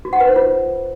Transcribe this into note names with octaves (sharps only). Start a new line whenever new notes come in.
F#4
F#5
B4
C5
F4